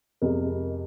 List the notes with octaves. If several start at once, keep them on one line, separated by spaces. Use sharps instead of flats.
F2 C3 G#3 A#4 D#5